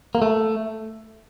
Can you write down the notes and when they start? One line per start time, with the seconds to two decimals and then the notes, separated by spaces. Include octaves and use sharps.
0.15 A#3
0.22 A3